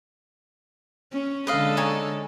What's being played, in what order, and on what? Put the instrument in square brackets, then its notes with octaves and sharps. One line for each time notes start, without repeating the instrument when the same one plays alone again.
[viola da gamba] C#4
[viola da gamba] D3 G#3 A4 [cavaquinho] B4 D#5 F5
[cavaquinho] D#4 C#5 G#5